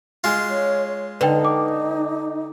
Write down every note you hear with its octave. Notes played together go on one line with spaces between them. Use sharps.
G#3 F4
C#5
D3 D#4 B4 G5
D6